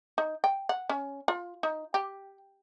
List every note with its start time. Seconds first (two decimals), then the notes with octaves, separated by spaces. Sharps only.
0.18 D#4
0.44 G5
0.69 F#5
0.89 C#4
1.28 F4
1.63 D#4
1.94 G4